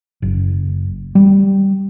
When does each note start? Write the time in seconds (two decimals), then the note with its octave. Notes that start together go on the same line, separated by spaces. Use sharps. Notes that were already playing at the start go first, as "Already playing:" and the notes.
0.22 F#1
1.15 G3